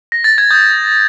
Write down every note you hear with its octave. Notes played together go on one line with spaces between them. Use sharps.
A#6
A6
G#6
D#6 G6